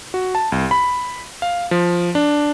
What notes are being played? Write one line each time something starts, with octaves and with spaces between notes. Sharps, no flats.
F#4
A5
C2
B5
F5
F3
D4